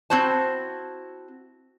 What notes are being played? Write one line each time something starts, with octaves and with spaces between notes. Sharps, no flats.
C4 E4 F#4 C5 A5